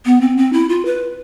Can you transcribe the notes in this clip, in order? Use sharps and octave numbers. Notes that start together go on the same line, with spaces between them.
B3
C4
C4
E4
F4
B4